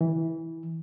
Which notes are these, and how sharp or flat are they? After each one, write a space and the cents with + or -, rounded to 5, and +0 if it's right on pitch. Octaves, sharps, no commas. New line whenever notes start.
E3 -15